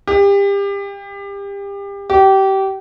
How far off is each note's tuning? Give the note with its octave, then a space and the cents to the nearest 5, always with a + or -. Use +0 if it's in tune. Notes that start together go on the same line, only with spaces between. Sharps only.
G4 +30
G4 -25